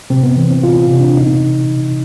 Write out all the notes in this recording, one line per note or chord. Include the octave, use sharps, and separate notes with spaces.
C3 C4
B3
E3
C4
E3 F4
C3
D4
B2 D#4